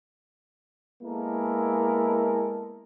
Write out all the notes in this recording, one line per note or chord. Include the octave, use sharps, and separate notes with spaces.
G#3 A#3 B3 E4 A4 A#4